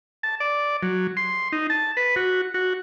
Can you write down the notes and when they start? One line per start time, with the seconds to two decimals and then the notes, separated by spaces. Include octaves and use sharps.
0.23 A5
0.40 D5
0.83 F#3
1.17 C6
1.52 D#4
1.70 A5
1.97 B4
2.16 F#4
2.54 F#4